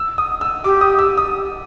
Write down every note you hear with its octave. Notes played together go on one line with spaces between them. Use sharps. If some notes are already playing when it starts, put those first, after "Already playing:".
Already playing: E6
D#6
E6
G4 D6
D#6
E6
D#6